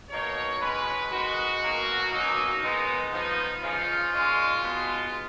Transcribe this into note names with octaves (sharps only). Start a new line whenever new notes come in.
B2 A#3 D#4 C#5
B2 G#3 C#4 B4
D#3 G#3 D#4 F#4
B2 F#3 A#3 C#4
B2 F#3 A#3 C#4 D#4
D#3 G#3 B3 D#4
F3 B3 D#4
C#3 F3 G#3 D#4 F4
A#2 G#3 C#4
B2 G#3 B3 D#4